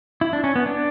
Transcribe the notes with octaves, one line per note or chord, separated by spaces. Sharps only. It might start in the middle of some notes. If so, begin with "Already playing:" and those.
E4
D4
C#4
B3
D4